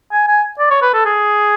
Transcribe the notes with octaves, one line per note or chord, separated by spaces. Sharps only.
G#5
G#5
D5
C#5
B4
A4
G#4